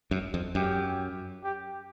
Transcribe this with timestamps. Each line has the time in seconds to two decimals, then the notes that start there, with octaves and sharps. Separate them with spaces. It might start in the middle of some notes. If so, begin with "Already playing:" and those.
0.11 F#2
0.34 F2
0.55 F#2 G4
1.43 G4